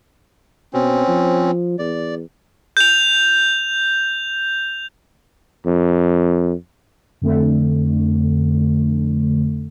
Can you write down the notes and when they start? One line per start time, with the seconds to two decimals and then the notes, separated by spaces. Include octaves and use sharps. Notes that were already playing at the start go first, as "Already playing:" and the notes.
0.73 B2 C4 C#4
1.08 F3
1.79 E2 D5
2.77 G6 F7
5.66 F2
7.22 F2 D3 A3